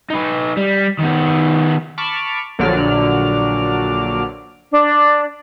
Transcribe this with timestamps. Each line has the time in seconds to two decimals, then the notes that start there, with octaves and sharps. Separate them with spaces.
0.10 D#4 B4
0.57 G3
0.99 D#3 B3
1.98 A5 B5 C#6 D6 F6
2.59 A#1 D3 F#3 D5 F6
4.71 D4